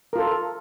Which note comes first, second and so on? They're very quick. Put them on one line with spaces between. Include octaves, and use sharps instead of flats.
A#4 F4 A4